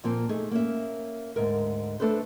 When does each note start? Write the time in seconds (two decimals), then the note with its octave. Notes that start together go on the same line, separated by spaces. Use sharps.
0.04 A#2 F3 A#3 C4
0.29 A3 D#4 G#4
0.51 A#3 C#4 E5
1.36 D2 G#2 A#4
2.00 A3 D4 A4 B4 C5